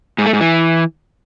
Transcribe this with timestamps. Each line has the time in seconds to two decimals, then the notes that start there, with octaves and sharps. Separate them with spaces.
0.18 G#2
0.26 A3
0.33 G#2
0.41 E3